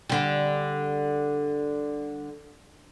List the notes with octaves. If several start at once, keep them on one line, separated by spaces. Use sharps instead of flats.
D3 G3